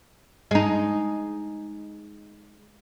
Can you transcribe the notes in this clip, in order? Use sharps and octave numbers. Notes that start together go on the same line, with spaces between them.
G#3 D#4